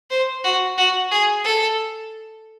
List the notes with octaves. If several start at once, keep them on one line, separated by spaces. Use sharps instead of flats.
C5
F#4
F#4
G#4
A4